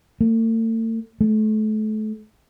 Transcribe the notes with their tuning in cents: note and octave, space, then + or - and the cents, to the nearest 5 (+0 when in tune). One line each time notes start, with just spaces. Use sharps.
A3 +45
A3 -30